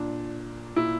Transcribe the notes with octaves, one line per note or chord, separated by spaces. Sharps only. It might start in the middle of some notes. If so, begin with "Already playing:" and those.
Already playing: A#2 D4
A#2 E4